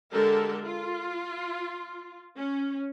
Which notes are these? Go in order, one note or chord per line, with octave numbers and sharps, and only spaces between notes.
D3 G#3 G4 A4 A#4
F4
C#4